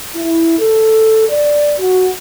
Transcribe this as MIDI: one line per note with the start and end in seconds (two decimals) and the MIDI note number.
0.15 0.56 64
0.59 1.25 69
1.29 1.72 74
1.78 2.08 66